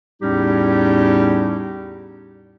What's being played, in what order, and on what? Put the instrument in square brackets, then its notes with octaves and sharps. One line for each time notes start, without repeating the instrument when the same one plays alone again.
[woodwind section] E2 A2 G3 C#4 D#4 G4